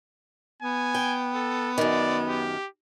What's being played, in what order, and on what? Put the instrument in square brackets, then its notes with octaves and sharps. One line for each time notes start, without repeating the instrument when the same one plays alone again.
[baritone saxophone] B3 [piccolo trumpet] G#5
[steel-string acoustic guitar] G5
[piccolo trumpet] A4
[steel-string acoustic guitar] F#2 D#3 [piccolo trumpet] D5
[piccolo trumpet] G4